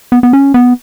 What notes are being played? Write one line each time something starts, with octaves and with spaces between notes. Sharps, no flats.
B3
B3
C#4
B3